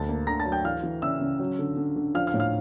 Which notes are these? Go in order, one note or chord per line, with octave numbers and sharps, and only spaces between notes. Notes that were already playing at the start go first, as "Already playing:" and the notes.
Already playing: D2 A5 A6
A#3
D3 A#5 A#6
A5 A6
F#3
G5 G6
E3 F5 F6
E3
C#3 E5 E6
C#3
F#3
D3
D3
D3
F3 F5 F6
F5 F6
A2
F5 F6